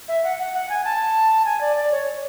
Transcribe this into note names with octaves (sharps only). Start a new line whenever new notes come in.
E5
F#5
F#5
F#5
G#5
A5
G#5
D5
D5
C#5